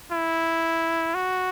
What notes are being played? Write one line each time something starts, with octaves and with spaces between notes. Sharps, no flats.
E4
F#4